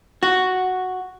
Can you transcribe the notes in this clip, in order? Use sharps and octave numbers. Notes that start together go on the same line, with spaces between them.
F#4